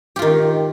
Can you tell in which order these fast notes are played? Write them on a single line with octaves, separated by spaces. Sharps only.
G4 F4 D#3